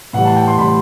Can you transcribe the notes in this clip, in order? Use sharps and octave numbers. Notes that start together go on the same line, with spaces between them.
A2 E3 G3 F#5
A5
G5
C6
A2 E3 G3 B5